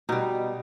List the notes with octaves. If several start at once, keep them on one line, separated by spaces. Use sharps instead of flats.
B2 G3 D#4